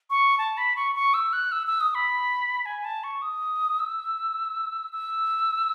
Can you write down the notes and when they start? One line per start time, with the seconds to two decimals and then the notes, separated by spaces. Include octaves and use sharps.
0.10 C#6
0.38 A5
0.58 B5
0.76 C#6
0.95 C#6
1.14 E6
1.33 F#6
1.52 E6
1.67 E6
1.80 D#6
1.95 B5
2.66 G#5
2.85 A5
3.04 C#6
3.22 D#6
3.79 E6
4.93 E6